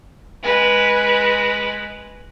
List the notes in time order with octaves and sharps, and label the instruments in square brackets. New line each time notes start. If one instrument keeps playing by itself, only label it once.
[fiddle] G#3 B4